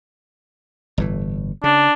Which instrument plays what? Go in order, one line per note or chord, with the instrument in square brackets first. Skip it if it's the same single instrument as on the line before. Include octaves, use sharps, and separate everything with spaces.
[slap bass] G1 A2 E3
[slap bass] C#3 [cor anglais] D4